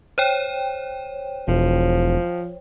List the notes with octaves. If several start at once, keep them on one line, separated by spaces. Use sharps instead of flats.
C5 C#5 G5
E1 F3